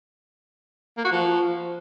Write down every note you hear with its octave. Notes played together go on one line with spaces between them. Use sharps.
A#3
F#4
F3